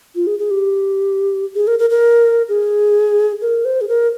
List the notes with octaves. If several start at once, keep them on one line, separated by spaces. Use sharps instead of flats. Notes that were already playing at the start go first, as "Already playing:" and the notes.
F4
G#4
G#4
G4
G#4
A#4
A#4
A#4
G#4
A#4
C5
G#4
A#4